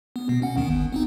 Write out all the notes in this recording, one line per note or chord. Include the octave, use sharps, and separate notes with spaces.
B3
B2
C#4 F#5
D2 D#3 B3
G1
B3 C4 D#4